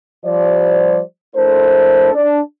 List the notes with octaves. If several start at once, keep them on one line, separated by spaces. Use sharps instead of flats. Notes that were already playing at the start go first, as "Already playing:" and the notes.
F3 G3 C5 D5
A3 D4 E4 A4 A#4 C5
D4